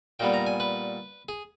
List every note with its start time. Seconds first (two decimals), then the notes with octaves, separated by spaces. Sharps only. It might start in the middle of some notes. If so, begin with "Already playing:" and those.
0.19 A#2 G3 B3 G5
0.34 A#5
0.46 G#5
0.60 B4
1.29 G#4